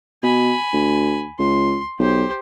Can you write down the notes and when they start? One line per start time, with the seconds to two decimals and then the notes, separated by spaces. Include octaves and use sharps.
0.23 B2 G#5 B5
0.73 D2
1.39 C#2 C6
1.99 B1 G4 C5